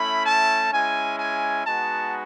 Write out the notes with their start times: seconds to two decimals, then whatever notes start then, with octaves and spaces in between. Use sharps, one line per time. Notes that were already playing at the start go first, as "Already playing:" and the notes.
Already playing: A3 C#4 E4 B5
0.24 A5
0.71 G#3 C#4 E4 G#5
1.18 G#5
1.65 G#3 B3 D#4 F#4 A5